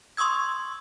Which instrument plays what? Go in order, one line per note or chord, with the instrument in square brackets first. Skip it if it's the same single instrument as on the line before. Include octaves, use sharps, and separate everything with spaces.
[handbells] C6 C#6 D#6 E6 G#6